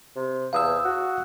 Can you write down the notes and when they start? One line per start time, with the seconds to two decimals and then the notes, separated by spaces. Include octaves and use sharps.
0.16 C3
0.53 E2 F5 D#6 E6
0.85 F#4